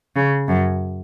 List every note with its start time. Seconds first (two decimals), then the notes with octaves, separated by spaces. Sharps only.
0.16 C#3
0.48 F#2